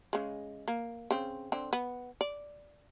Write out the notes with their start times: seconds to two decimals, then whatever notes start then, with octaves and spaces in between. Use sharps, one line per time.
0.13 C#3 G#3
0.68 A#3
1.10 C#3 C4
1.52 D3 C4
1.73 B3
2.21 D5